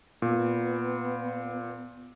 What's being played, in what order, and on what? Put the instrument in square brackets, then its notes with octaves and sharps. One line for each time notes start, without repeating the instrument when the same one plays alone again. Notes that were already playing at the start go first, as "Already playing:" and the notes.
[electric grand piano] A#2 [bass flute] B3